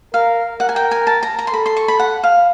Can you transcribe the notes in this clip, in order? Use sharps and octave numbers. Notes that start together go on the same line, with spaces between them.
A#4 F5
A#4 F#5
G#5
G5
G#5
A5
A#5
A#5
C6
A4 B5
C6
C#6
B5
F#5
F5